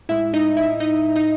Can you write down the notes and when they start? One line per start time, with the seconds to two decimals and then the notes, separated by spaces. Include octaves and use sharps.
0.09 A2 G#3 E4 E5
0.34 D#4 D#5
0.57 E4 E5
0.80 D#4 D#5
1.16 D#4 D#5